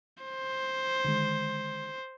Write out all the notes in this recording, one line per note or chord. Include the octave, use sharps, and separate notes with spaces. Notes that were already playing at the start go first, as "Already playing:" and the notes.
C5
D3 D#3 G#3